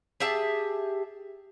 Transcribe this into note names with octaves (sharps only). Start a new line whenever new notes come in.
G4 G#4 E5 A5